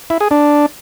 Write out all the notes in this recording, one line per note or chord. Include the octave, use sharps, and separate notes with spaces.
E4
G#4
D4